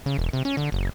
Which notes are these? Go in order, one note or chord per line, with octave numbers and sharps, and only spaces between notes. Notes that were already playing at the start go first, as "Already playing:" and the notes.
C#3
E1
C3
C#4
D3
F#1